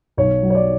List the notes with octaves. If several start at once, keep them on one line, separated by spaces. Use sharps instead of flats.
B1 C#5
F#3
C#5
D5